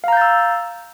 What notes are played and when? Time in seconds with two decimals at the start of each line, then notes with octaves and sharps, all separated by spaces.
0.04 F5
0.08 A#5
0.13 G6
0.17 A6
0.21 E6